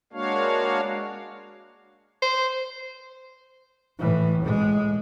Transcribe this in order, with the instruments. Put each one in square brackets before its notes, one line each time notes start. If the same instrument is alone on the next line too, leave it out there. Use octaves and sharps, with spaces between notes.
[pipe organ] G#3 A#3 D4 F#4 C#5 F5
[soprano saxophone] C5
[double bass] A2 E3
A2 G#3